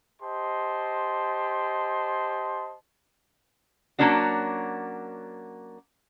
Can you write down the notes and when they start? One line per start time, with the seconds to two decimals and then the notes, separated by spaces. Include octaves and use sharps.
0.23 G4 C5 D#5 A5 C6
3.99 F#3 G#3 A#3 C#4 D4 F#4